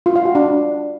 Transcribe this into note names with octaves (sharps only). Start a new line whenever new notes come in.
F4
F5
F#4
D4